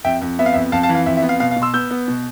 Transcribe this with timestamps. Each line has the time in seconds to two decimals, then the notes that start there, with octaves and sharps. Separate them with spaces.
0.04 F2 E5 G5
0.22 F2
0.39 B3 E5
0.46 F5
0.53 F2 E5
0.72 F2 F5 A5
0.83 F5 A5
0.89 E3
0.95 F5
1.06 F2 E5
1.17 E5
1.22 B3
1.29 F5
1.40 B2 F5
1.51 F5
1.56 B2
1.62 C6 E6
1.74 B3 E6 G6
1.91 B3
2.08 B2